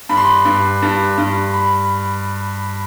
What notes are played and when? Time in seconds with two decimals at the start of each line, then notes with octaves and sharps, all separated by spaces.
0.09 G2 B5
0.17 C6
0.25 B5
0.45 G2
0.82 G2
1.18 G2
1.54 B5